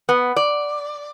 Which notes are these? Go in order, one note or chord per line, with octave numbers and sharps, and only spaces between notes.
B3
D5